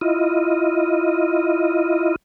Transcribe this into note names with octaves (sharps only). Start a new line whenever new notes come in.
E4 F4 D#5